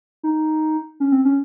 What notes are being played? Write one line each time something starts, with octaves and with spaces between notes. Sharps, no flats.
D#4
C#4
C4
C#4